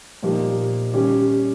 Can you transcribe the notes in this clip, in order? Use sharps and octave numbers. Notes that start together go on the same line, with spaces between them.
A#2 F3 A#3 D#4 G4
D#3 G3 C#4 G4